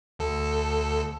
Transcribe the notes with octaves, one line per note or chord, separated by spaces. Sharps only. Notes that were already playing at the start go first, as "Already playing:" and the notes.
D2 A4